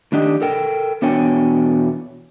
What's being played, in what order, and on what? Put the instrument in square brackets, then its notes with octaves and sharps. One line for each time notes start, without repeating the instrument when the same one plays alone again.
[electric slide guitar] A2 D#3 D4 G4 D#5
A4 A#4 G5
E2 B2 D4 C#5 G5 G#5